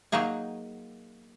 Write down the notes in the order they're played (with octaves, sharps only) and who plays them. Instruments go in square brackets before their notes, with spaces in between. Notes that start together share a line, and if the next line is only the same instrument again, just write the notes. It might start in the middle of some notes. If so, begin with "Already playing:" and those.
[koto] F#3 A#3 D#4 G#4